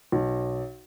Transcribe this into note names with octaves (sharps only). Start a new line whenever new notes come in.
B1